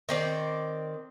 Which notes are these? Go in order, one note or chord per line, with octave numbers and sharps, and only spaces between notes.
D#3 C4 D5